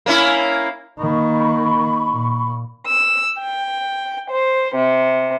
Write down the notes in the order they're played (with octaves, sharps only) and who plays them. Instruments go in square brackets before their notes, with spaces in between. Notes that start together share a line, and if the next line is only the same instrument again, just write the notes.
[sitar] A#3 C#4 E4
[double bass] D#3 A#3 [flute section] B5 C#6
[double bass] A#2
[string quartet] E6
G5
C5
C3